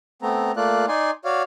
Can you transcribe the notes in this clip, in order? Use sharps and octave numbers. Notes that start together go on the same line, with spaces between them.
A3 B3 C4 A#5
A3 A#3 F4 D5 F#6
D#4 D5 G#5 C6
F#4 C#5 D5 F5